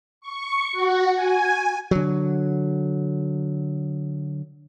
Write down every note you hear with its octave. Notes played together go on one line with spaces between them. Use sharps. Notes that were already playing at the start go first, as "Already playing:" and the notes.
C#6
F#4
G#5
D3 F#3